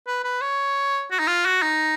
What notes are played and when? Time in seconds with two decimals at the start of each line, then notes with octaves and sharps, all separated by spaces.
0.07 B4
0.24 B4
0.41 C#5
1.11 F#4
1.19 D#4
1.27 F4
1.46 F#4
1.62 D#4